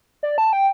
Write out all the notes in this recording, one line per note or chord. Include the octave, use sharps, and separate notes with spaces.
D5
A5
G5